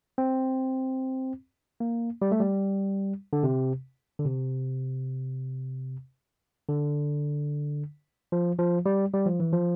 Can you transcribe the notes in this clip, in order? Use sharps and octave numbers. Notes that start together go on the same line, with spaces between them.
C4
A#3
G3
A3
G3
D3
C3
D3
C3
D3
F3
F3
G3
G3
F3
E3
F3